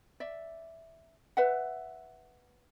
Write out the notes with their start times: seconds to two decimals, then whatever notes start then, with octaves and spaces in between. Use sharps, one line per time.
0.20 D5 E5
1.37 B4 E5 F#5